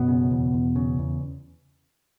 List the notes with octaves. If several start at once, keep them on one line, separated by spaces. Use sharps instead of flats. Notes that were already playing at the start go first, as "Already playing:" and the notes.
Already playing: F#2 B2 B3
C#3
E2
E2
C#3
E2